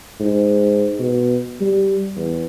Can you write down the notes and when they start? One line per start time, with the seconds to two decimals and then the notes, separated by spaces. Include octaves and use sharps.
0.20 G#2
0.99 B2
1.61 G3
2.16 E2